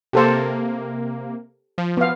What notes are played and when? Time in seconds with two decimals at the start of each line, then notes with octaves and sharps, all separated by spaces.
0.13 C3 A#3 G4 A4 C5
1.78 F3
1.97 B3 F5